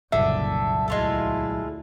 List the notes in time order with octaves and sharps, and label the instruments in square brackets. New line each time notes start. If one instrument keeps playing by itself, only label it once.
[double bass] F#1 [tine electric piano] C2 A#2 F#3 [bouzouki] D3 [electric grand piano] E5
[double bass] D2 E4 [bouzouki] G#3 F4 A4